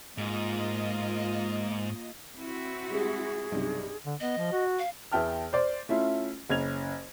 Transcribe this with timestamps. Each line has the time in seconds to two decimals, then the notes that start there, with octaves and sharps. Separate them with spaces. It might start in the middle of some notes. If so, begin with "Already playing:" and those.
0.18 G#2 A#3 F4 D#5
2.37 C4 E4 F#4
2.90 G3 G#3 G#4
3.52 B1 G2 C3
4.06 D3
4.20 B3 D#5
4.38 F3
4.52 F#4
4.79 F5
5.12 E2 B3 E4 G5 A5 F6
5.53 C5 D5
5.89 A3 C#4 E4 F4
6.50 F#1 C#4 G#6 F7